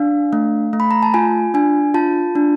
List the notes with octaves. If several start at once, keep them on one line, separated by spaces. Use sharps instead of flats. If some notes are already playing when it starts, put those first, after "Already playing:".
Already playing: D4 F5
A3
A3
B5
A#5
A5
F4 G#5
D4 G#5
F4 A5
D4